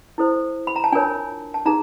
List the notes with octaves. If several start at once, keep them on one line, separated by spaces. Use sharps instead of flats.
E4 A4 C5
B5
A#5
A5
D4 F4 A#4 C#5 G#5
A5
D#4 G#4 A#5